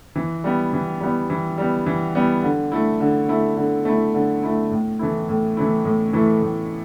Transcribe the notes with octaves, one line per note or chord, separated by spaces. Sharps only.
E3
G3 B3
E3
G3 B3
E3
G3 B3
E3
G3 B3
D3
A3 E4
D3
A3 E4
D3
A3 E4
D3
A3 E4
A2
E3 A3 E4
A2
E3 A3 E4
A2
E3 A3 E4
A2